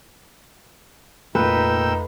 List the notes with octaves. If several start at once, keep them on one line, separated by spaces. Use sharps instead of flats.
F1 F2 A#2 D#4 B4 G5 E6